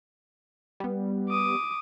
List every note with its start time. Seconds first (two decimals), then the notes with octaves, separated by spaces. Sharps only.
0.80 G3 B3
1.30 D6 D#6